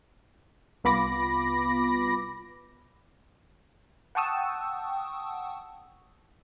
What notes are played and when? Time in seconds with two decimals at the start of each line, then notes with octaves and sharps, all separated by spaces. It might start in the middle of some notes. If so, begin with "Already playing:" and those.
0.84 C2 B3 F4 B5 D6 A#6
4.15 F#5 G5 A5 C#6 D#6 E6